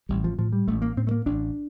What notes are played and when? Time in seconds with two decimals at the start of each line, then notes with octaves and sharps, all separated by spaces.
0.09 A1 G3
0.24 F3
0.38 A2 F3
0.53 G3
0.67 A1 A3
0.82 A#3
0.97 A2 C4
1.07 A3
1.11 A#3
1.26 A1 D4